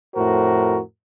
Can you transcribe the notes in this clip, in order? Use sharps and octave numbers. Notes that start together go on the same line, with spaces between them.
F2 A2 F#4 A#4 C5